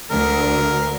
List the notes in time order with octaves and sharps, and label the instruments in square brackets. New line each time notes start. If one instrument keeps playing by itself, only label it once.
[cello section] D2 [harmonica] A#4